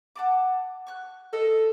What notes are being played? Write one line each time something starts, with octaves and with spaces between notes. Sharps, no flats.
F#5 A5 D6
C#6 F#6
A4 D#5